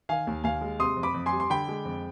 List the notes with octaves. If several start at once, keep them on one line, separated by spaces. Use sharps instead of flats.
D#3 F5 G#5
D#2
D#2 F5 G#5
G#3
C3 C6 D#6
F2
B5 D6
F2
G#5 C6
G3
C6
D3 G5 B5
G#3
F2